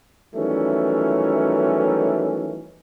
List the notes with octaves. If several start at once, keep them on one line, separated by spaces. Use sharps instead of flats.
D#3 E3 F#3 G3 A3 C#4